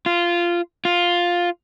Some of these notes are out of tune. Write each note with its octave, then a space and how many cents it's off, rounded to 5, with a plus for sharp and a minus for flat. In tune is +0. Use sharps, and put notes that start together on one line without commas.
F4 -10
F4 +5